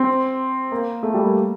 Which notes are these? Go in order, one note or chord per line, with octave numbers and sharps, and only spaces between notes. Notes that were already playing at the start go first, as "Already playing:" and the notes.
Already playing: C4
A#3
A3
G3
A#3